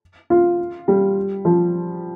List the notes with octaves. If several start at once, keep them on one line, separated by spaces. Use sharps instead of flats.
F4
G3
F3